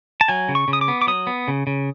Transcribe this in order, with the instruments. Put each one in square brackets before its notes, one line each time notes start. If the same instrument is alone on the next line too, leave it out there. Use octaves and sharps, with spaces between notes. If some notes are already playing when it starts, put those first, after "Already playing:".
[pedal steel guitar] A5
F#3 G#5
C#3
C#6
C#3
D#6
D6
B3
D6
F#3 D#6
B3
C#3
C#3